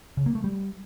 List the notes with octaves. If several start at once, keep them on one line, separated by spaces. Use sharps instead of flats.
C#3
A#3
A3
G3